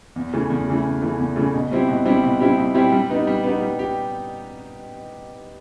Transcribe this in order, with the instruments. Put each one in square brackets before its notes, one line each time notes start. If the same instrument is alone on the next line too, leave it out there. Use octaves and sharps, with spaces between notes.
[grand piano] E2
C#3 E3 A3
E2
C#3 E3 A3
E2
C#3 E3 A3
E2
C#3 E3 A3
B2
G3 C4 E4 G4
B2
G3 C4 E4 G4
B2
G3 C4 E4 G4
B2
G3 C4 E4 G4
G3
B3 D#4 G4
G3
B3 D#4 G4
G3
G4